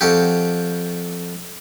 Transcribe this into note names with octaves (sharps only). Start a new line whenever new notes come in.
F2 F#4 G4